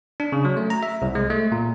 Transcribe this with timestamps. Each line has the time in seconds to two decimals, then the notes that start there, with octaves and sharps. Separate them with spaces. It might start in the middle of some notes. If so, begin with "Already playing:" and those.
0.20 D4
0.32 C#3
0.45 F#3
0.57 A3
0.70 A#5
0.83 E5
1.02 C2
1.15 G#3
1.30 A3
1.52 A#2